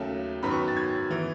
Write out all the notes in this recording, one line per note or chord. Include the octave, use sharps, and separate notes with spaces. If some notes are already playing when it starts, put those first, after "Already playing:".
Already playing: D#2 C#3 F#3 A3
F#2 D#3 F#3 B3 B5
C#6
A6
G#6
E3 B3